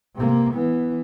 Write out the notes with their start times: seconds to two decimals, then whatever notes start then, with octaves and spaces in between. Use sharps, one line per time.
0.15 C3 A#3
0.54 E3 B3